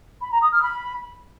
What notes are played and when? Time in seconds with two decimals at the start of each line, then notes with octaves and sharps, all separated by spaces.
0.21 B5
0.31 A#5
0.41 D#6
0.52 F6
0.62 B5